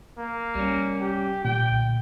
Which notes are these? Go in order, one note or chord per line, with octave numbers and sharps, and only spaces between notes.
A#3
C2 G3 C#4
G4
D2 A#2 G5